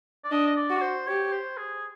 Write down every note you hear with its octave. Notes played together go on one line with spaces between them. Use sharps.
D5
D4 D#5
D#5
D5
F#4
C5
G4 C#5
C5
G#4